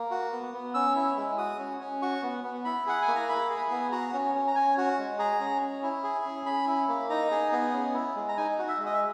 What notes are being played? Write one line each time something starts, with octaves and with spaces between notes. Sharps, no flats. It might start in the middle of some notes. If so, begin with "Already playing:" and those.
Already playing: A#3
F#4
B3
B3
C#4 E6
E4
G#3
F#4 D#6
C#4
C#4
F#4 C#6
B3
B3
E4 B5
G#4 F#5
G#5
A#3
A#5
E4 B5
G#4
B3
F#4 A#5
C#4
C#4
A#5
C#4 G#5
F#4
G#3
G#4 A#5
C#4
C#4
E4
G#4
C#4
C#4 B5
E4
A#3
D#4 A#5
G#4
B3
C#4
E4
G#3
A#5
D#4 G#5
F#4
E5
G#3
D#5
E5